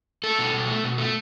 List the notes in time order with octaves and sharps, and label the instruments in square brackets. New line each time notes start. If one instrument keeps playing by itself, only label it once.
[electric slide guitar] A3 A4
B2
B2
A3
B2
A3